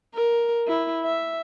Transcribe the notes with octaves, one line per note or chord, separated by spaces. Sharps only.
A#4
E4
E5